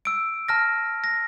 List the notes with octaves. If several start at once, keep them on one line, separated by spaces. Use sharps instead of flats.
E6 D7
A5 F6 A#6
A#6